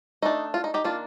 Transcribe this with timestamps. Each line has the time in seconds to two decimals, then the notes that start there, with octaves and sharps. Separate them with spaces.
0.22 A3 D4 D#4
0.54 F4
0.64 D#4
0.74 D#4 G4
0.84 D#3 A#3 D4 F4